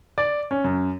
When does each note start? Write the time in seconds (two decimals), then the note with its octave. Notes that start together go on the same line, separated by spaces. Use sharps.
0.18 D5
0.51 C#4
0.64 F#2